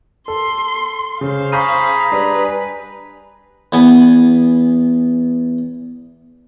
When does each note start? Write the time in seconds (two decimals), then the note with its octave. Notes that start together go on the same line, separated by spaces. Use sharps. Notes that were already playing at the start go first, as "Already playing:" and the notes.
0.28 A4 C6
1.21 C#3 C5 F5
1.52 G#4 A#5 B5 C#6 G6 D#7
2.11 G3 D4 B4 B6
3.72 E2 B3 G#5